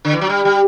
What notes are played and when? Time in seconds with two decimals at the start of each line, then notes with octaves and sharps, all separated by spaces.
0.05 D3
0.13 E3
0.21 F#3
0.29 G3
0.45 G3